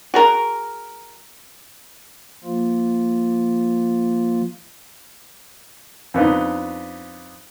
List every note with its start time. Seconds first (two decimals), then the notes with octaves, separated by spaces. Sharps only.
0.14 F#4 G#4 A#4
2.44 F3 A#3 F4
6.14 F2 B3 D4 D#4